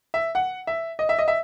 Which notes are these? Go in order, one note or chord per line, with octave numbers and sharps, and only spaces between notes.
E5
F#5
E5
D#5
E5
D#5
E5